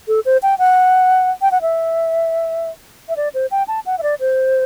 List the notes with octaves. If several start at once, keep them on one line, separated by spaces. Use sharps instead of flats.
A4
C5
G5
F#5
G5
F#5
E5
E5
D5
C5
G5
A5
F#5
E5
D5
C5